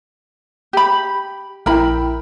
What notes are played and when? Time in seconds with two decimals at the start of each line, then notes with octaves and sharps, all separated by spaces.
0.73 G4 B5
1.66 A#1 E4 A#4 E5 G5 B5